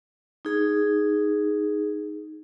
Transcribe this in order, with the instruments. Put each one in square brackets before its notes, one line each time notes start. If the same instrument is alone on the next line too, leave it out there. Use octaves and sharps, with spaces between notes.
[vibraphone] D#4 G#4